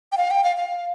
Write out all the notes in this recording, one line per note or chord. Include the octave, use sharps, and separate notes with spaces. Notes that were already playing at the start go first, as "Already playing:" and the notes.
G5
F5
G5
F5
F5